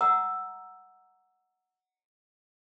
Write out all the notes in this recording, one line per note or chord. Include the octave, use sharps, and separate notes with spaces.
D#5 F#5 A#5 D#6 E6